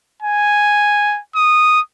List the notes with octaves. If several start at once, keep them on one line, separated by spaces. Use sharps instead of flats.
G#5
D#6